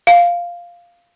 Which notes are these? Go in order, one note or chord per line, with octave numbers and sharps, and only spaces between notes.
F5